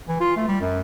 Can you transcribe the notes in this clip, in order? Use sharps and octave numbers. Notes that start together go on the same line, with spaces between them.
E3
F4
A3
G3
F#2